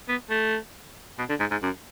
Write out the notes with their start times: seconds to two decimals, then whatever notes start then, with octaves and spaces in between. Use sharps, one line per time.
0.08 B3
0.30 A3
1.18 B2
1.29 D3
1.40 G#2
1.51 G#2
1.63 F#2